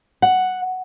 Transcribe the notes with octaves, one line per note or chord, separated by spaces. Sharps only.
F#5